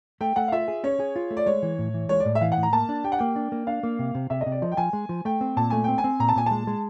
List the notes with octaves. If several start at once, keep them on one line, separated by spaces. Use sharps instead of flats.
A3 G5
A3 F#5
F5
F4 E5
G#4
C#4 C#5
G#4
F4
A3
D5
G#3 C#5
E3
A2
E3
G#3 C#5
D5
A2
E5
E3 F5
F#5
A2
A#5
A#3 A5
D4
G4 G5
F#5
A#3 G5
D4
A#3
D4 F5
A#3
C3
C3
C3 E5
D#5
C3
D5
F3 D#5
G5
F3 G#5
G#3
F3
A3 G5
C4
A#2 A5
A3 G#5
C4 G5
G#5
C4
A#2 A#5
A5
A#2 G#5
G#3 A5
G#3